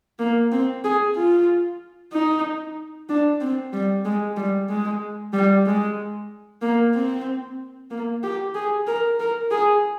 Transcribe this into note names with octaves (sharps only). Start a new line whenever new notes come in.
A#3
C4
G#4
F4
D#4
D4
C4
G3
G#3
G3
G#3
G3
G#3
A#3
C4
A#3
G4
G#4
A#4
A#4
G#4